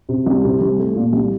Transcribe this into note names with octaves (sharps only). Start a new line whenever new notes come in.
C3
C2
C3
C2
A3
A#2
C2